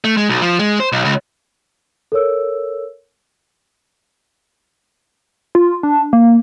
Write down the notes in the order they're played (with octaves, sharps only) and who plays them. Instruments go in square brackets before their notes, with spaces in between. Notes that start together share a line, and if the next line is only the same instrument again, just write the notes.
[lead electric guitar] A3
G#3
B1
F3
G#3
C5
B1
C#2
[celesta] A4 A#4 C#5 E6
[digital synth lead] F4
D4
A#3